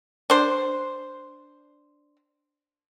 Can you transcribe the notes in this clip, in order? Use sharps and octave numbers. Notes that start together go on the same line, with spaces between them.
D4 C5